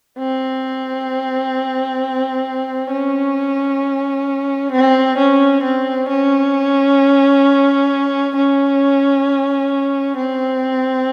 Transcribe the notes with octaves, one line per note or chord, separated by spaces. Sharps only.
C4
C#4
C4
C#4
C4
C#4
C#4
C4